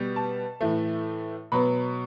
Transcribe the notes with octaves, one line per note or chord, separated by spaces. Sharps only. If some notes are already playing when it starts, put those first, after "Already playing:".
Already playing: B2 G3 B3
A5
A2 E3 A3
B2 F#3 B3 B5